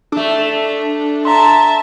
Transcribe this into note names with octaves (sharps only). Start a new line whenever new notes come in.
A3 D4 A4
E5 A5 A#5 C6